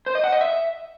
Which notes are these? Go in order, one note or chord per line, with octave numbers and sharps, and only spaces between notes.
C5
D#5
F#5
D#5
E5